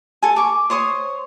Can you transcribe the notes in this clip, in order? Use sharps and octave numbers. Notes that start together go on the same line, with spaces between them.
A4 G#5
C#6 D6
C5 C#5 C6 D#6